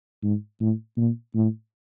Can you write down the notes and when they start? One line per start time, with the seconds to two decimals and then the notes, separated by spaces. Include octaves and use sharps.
0.23 G#2
0.60 A2
0.97 A#2
1.35 A2